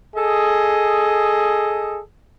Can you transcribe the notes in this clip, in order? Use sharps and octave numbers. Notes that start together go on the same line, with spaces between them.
G#4 A4 D#5